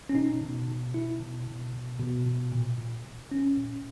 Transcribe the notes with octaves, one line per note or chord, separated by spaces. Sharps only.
C#4
B2 D#4
B2
B2
B2 E4
B2
B2
B2
B2
B2
A#2
A#2
A#2
A#2 C#4
A#2